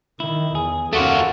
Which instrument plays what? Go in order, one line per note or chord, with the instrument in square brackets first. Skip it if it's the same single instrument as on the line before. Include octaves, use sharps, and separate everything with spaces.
[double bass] D#3 [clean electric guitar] E4
[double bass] E2 [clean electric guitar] G#4
[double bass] D#2 C#4 [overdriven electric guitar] A3 F4 [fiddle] F#4 [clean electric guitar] A4 A#4 D5